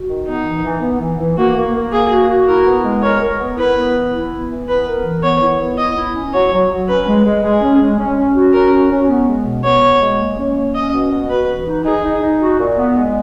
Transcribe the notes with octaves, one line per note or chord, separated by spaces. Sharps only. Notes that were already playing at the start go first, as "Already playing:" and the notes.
Already playing: F#4
D#3
B3 D#4
E3
E3
B3
E3
E3
A#3 F#4
A#3
A#3
A#3 G#4
F#4
F#4
E4 A#4
B3
G#3
A#4 C#5
A#4
B3
E4 B4
B3
E3
E4
B3
E3
B3 B4
A#4
E3
B3 C#5
E4
B3
E4 D#5
E4
C#4
F#3 C#5
F#3
F#3
C#4 B4
G#3
G#3
G#3 G#4
C#4
G#3
C#4
C#4
F#4
C#4 A#4
F#4
C#4
B3
G#3
B2
B3 C#5
B2
G#3
A#3
C#4
A#3
C#4 D#5
B2
B2
F#4 B4
E3
D#4
D#4 G#4
D#4
D#4
F#4
A#2
B3
G#3